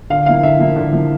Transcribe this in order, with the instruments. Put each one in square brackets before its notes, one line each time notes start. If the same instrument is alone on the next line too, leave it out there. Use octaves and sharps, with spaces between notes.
[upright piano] D3 F5
F3 A#3 E4 F5
D3 E5
F3 A#3 E4
D3
F3 A#3 E4